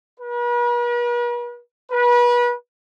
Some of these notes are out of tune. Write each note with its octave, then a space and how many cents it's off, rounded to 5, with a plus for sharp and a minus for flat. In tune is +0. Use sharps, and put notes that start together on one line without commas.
B4 -45
B4 -30